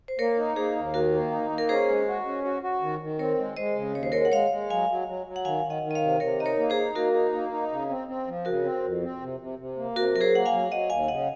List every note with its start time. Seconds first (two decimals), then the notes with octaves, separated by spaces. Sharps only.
0.08 C5
0.19 A#3 A#4 C#5
0.37 D#4
0.56 A#3 G#4 C5
0.76 D#2
0.94 D#3 F#4 A#4
1.13 A#3
1.31 D#4
1.50 A#3
1.58 A#4
1.69 C#4 G#4 C5
1.88 G#3
2.07 F#4
2.26 C#4
2.45 F#4
2.63 F#4
2.82 D#3
3.01 D#3
3.19 C4 A#4 C#5
3.38 G#3
3.57 G#3 C5 D#5
3.76 C#3
3.95 D#2 C#5
4.03 C5
4.12 G#3 A#4 C#5
4.25 F#5
4.32 G#3 C#5 F5
4.51 G#3
4.70 F#3 F5 G#5
4.89 F#3
5.08 F#3
5.26 F#3
5.36 F#5
5.45 D#3 F5 G#5
5.64 D#3
5.70 D#5 F#5
5.83 D#3
5.91 D#5
5.95 C#5 F5
6.01 C3
6.20 C3 A#4 C#5
6.39 D#4 D#5
6.46 A#4 C#5
6.57 A#3
6.70 G#4 C5
6.76 D#4
6.95 A#3 F#4 A#4
7.14 D#4
7.33 A#3
7.52 D#4
7.71 C#3
7.89 C4
8.08 C4
8.27 F3
8.45 C#3 F#4 A#4
8.64 C4
8.83 F2
9.03 C4
9.21 C3
9.40 C3
9.59 C3
9.77 A#3
9.96 C3 F#4 A#4
10.15 F#3 A#4
10.21 G#4 C5
10.34 A#3 F#5
10.46 F5 G#5
10.52 F#3
10.71 F#3 D#5 F#5
10.90 D#2 F5 G#5
11.08 C#3 D#5 F#5